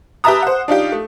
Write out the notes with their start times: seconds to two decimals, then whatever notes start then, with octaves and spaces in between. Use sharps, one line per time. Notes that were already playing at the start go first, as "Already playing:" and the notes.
0.24 G4 B4 E5 A5 A#5 D#6
0.42 C5 F#5
0.68 D4 D#4 F4 G4
0.92 A3